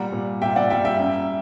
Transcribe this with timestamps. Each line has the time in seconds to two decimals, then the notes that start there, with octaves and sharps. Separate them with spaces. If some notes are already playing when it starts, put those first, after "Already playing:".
Already playing: A#2 G3 F#5 A#5
0.12 A#2
0.42 A#2 E5 G5
0.56 D5 F#5
0.70 G3 E5 G5
0.85 E5 G5
0.99 F#2